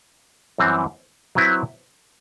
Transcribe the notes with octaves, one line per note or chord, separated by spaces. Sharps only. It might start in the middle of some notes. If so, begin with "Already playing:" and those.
F#2 E3 G3 C4
F#3 C4 E4 B4